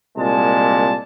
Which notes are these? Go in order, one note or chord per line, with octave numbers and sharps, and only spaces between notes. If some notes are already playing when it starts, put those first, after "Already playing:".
C2 A#2 G#3 A5